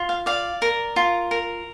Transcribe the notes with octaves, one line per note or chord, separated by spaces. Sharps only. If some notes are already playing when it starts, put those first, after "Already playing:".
Already playing: F4
F5
D5 F5
A#4
F4
A#4